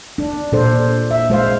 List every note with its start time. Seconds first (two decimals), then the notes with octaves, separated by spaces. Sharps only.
0.18 D4
0.52 A#2 D4 A4 C5
1.11 E5
1.30 G#3 C5 F5